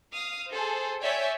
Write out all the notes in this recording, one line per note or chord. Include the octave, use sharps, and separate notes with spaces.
F5 D#6
G#4 A4 C5
C#5 D5 E5 G5 G#5